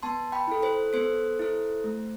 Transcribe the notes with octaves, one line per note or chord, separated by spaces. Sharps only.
B3 A5 C6
G5 B5
E4 A4
A4 C5
B3 A4 C5
E4 A4
A3